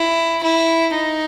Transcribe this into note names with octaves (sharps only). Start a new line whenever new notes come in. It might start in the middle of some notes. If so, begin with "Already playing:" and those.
Already playing: E4
E4
D#4